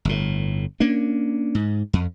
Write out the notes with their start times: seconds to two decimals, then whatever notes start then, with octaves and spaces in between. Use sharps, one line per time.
0.05 G1 A2
0.80 A#3 C#4 D4
1.55 G#2
1.93 F2